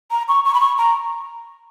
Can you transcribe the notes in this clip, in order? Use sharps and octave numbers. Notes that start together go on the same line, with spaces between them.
A#5
C#6
C#6
B5
C#6
A#5